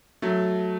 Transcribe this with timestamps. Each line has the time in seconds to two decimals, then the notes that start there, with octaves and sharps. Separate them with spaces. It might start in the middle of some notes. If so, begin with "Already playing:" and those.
0.22 F#3 A3